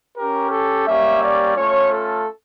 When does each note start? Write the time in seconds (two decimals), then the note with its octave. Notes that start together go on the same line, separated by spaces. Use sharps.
0.17 C#4 G4 A#4
0.51 A4
0.87 G3 A#3 C#4 G4 E5
1.22 D5
1.56 A3 C#4 F4 C#5
1.91 A4